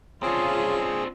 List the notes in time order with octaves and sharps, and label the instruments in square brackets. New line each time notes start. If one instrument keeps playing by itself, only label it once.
[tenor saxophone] C#3 [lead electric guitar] C4 D4 [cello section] F4 [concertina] G#4